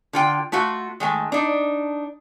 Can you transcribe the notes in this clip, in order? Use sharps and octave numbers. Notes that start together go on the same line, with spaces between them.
D3 F4 G5
A3 F4 F#4
D#3 G#3 A3
D4 D#4